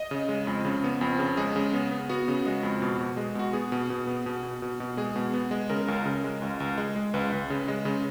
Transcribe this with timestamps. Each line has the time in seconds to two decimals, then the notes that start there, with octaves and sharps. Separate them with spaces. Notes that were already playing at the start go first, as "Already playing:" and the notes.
Already playing: D#5
0.11 C#3
0.29 G#3
0.47 F2
0.65 C#3
0.84 B3
1.01 F2
1.19 C#3
1.37 G#3 G#4
1.56 C#3
1.73 B3
1.91 B3
2.09 B3 F#4
2.28 C#3
2.46 G#3
2.63 F2
2.82 B2
3.00 B2
3.17 G#3
3.35 B2 F#4
3.53 B3 G#4
3.72 B2
3.90 B2
4.07 B3
4.26 B2
4.43 B2
4.62 B2
4.80 B2
4.97 G#3 G#4
5.16 B2
5.34 B3
5.51 G#3
5.70 C#3 A#4
5.88 C#2
6.06 C#3
6.24 G#3
6.42 C#2
6.60 C#2
6.78 G#3
6.96 G#3
7.14 C#2 B4
7.32 C#2
7.50 C#3
7.68 G#3
7.85 C#3